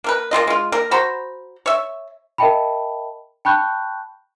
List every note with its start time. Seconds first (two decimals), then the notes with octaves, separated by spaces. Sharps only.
0.04 A#3 A#4 B4
0.31 A#3 C4 F4 D#5
0.47 G#3 F4
0.72 A#3 A#4
0.91 F#4 C5 A#5 B5
1.66 C#5 E5
2.38 A#4 D#5 E5 G5 A5 B5
3.45 G5 A5 B5 C#6 F#6 G6